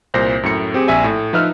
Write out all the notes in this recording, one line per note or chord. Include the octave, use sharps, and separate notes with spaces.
C2 A#2 C5 A#6
F#2 A2 C#7
C4 G4 G#4
A#1 E5 G#5
A2
F3 D#4 B4 E5 F6